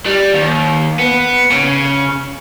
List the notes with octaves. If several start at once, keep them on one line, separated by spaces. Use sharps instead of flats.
G3
D#2
B3
C#3